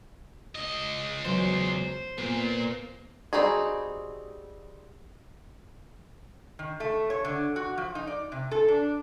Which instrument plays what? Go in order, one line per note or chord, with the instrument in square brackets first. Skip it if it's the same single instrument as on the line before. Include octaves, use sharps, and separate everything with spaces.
[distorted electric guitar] C#2 D#5
[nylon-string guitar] E2 F#3 [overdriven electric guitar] C5
[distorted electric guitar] A#2 [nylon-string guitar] B3
[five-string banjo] G3 C4 D#4 F#4 G#4
[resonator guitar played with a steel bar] D#3
A3
C#5
D3
F#4
F3
D#4
D5
C3
A4
D4